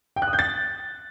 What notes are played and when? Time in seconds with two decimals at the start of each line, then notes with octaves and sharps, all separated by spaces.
0.16 G5
0.22 F#6
0.28 D#6
0.33 G6
0.39 A6